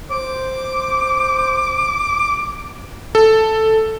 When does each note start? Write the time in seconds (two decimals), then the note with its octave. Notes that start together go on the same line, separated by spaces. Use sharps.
0.11 C5 D6
3.15 A4